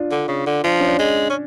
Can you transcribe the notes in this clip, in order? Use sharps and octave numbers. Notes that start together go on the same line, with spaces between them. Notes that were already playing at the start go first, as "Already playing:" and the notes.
Already playing: D4 F4
D3
C#3
D3
F3 D4
C#4
D4
G#3
C#4